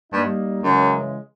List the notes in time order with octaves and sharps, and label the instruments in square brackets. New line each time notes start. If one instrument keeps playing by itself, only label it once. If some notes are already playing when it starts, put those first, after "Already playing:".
[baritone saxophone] G2 [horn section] G3 A#3 D#4
[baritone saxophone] F#2 [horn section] C#3 E3 G#3